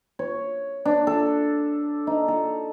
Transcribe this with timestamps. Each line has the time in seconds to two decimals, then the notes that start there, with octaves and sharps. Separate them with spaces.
0.19 C#5
0.85 D4
1.07 A4
2.07 D#4
2.28 A4